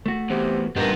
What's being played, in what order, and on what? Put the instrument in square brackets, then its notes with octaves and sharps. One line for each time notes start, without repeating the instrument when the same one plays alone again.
[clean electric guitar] A3 F#4
[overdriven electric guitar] E2 [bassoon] C3
[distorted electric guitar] G2 A#2 [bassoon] D#3 [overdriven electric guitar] B3 [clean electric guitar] G4 A#4